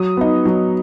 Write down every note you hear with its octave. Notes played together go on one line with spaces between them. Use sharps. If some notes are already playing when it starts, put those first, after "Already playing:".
Already playing: F#3 D#6
B3 D#4
F#3